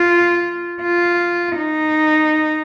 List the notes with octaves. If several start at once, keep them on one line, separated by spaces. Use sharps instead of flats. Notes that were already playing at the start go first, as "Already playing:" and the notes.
Already playing: F4
F4
D#4